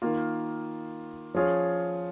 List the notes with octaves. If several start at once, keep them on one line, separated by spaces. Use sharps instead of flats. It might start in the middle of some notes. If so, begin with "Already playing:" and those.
D#3 A#3 F4
F3 C#4 F4 G#4 C#5